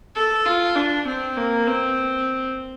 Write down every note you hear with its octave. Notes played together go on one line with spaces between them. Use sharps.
A4
F4
D4
C4
A#3
C4